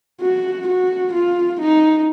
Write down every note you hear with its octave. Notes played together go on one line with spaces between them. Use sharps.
F#4
F#4
F4
D#4